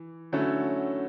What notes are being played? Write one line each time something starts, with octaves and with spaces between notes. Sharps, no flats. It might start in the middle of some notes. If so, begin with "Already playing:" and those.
Already playing: E3
D3 F#3 A3 C#4 E4